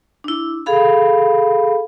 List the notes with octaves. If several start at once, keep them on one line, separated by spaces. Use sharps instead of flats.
D4 E4
G#4 A4 F5 B5